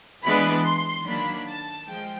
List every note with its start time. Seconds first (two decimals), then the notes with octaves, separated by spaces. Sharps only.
0.24 E3 G#3 B3 D4 B5
0.64 C6
1.06 D#3 F#3 A#3 D4 B5
1.47 A5
1.89 F3 G#3 G5